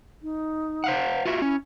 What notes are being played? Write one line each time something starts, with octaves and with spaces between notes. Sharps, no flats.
D#4
C5 F5 F#5
B4
F4 F#4 E5
C#4 E4